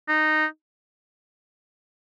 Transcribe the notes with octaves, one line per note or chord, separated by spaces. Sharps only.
D#4